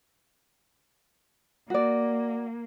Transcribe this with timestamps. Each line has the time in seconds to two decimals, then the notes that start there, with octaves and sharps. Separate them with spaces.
1.70 A#3 F#4 D5